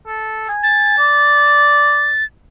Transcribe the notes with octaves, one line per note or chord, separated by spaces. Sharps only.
A4
G#5
A6
D5